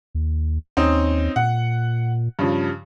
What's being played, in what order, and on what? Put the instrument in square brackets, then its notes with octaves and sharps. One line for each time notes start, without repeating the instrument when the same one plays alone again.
[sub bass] D#2
[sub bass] D#2 [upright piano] C4 C#4 D#4
[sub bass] A#2 [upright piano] F#5
[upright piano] G2 C#3 F3